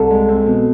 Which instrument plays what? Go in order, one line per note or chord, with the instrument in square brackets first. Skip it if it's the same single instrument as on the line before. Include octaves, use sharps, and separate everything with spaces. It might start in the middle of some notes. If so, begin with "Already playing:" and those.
Already playing: [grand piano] C2 [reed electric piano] A4
[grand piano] G#3
C4
B2